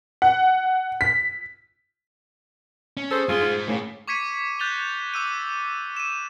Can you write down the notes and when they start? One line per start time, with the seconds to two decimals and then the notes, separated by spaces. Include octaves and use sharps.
0.22 F#5
1.01 B6
2.97 C#4
3.11 G#4 A4 C5
3.29 G2 F4 G#4 C6
3.41 D#4 C5
3.69 A2 C#3 A#3 C#4
4.08 C#6 D6 G#6 B6 C#7 D#7
4.59 F#6 G6 A6 D#7 F7 G7
5.14 D6 E6 D#7
5.97 D#7 E7